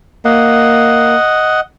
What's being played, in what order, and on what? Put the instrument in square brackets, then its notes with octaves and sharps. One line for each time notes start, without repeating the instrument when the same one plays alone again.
[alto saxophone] A#3 [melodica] D#5 F#5